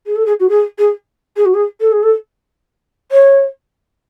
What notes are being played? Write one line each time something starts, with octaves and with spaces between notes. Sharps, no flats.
G#4
A4
G#4
F#4
G#4
G#4
G#4
F#4
G#4
A4
G#4
A4
C#5